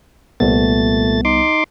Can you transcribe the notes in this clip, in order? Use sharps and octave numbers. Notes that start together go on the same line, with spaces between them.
C2 A#2 G3 A3 B3 A6
D#4 C6 D6